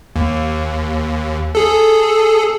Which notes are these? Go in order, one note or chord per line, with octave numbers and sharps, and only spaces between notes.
D#2
G#4 A4